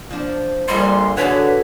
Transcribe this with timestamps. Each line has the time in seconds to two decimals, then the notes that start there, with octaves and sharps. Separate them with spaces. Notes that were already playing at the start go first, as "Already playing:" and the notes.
0.11 F3 D4
0.68 A#1 A#2 D3 G3 C6
1.17 D3 F#4 G#4 A4 B4 C#5